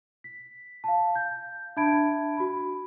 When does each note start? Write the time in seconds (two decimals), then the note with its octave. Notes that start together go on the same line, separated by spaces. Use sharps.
0.24 B6
0.84 F5 A5
1.15 G6
1.77 D4 E5 A5 B5 G#6 D7
2.37 F#4 B5